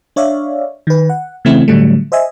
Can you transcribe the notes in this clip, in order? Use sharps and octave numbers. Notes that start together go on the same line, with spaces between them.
D4 C#5 D5 E5 F5
D#3 B4
F#5
C#3 E3 A3 C4 E4
A2 D3 F#3 G3 A3
C5 D#5 E5 G#5